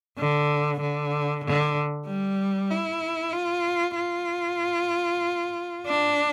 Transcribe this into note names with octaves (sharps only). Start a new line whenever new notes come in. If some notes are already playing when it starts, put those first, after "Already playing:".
D3
D3
D3
G3
E4
F4
F4
D4